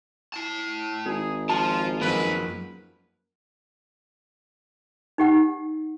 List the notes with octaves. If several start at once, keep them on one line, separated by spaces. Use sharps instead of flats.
E4 A5
G#1 G#4
F3 F4 A5
F#2 D#3 F3 G#3 A#3 B4
D#4 G4 F#5